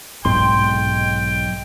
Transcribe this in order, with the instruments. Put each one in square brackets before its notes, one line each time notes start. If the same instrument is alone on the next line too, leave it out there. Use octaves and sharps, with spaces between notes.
[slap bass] B1 G#3 [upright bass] G#2 C3 [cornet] G5 [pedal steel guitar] C6